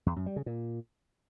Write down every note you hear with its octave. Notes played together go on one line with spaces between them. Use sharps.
E2
F#2
G3
C#3
A#2